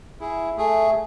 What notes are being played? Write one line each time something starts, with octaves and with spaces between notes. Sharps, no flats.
E4 G#4
A3 G#4